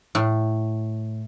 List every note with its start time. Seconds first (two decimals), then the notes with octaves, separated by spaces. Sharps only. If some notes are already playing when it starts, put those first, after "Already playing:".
0.15 A2